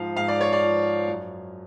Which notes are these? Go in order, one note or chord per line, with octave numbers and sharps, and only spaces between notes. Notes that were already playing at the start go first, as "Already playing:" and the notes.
Already playing: G#2 F3 F5
G#2 F5
D5
C#5
D5
F3
F#2